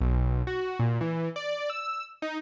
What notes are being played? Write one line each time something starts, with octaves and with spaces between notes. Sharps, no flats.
B1
F#4
A#2
E3
D5
E6
D#4